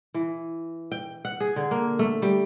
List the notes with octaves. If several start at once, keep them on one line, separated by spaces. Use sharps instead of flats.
E3
G5
F#5
G#4
D3
A#3
A3
G3